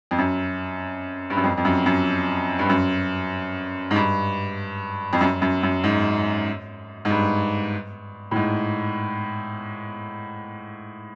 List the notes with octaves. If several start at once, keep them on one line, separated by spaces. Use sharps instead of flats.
F2
F#2
G2
F#2
F2
F2
F#2
F#2
G2
F#2
G#2
G2
F2
F#2
F#2
F#2
G#2
G#2
G2
A2
G#2